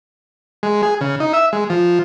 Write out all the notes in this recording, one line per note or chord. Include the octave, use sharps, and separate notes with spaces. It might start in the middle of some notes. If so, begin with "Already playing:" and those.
G#3
G#4
C#3
D#4
E5
G#3
F3